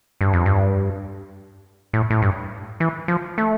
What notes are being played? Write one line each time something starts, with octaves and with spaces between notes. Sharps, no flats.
G2
F2
G2
A2
A2
G2
E3
F3
A3